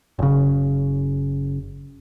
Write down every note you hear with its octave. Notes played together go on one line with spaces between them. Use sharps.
F#1 C#3